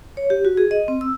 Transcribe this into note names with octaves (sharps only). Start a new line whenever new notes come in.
C#5
G4
F#4
G#4
D#5
C4
E6